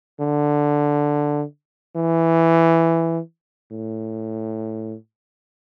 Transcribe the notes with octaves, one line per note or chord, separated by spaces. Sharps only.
D3
E3
A2